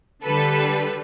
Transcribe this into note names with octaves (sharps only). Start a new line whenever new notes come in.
D3 G3 A4 B4